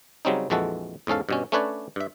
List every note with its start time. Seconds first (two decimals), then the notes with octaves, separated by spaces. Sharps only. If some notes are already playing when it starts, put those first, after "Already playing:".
0.25 C#3 F#3 G3 C4 C#4 D#4
0.50 A#1 F2 E3 G#3 F#4 A4
1.07 E2 G#2 C#4 A4 F5
1.29 G2 B2 C#4
1.52 A3 C#4 D4 B4 C#5 D5
1.96 G2 E5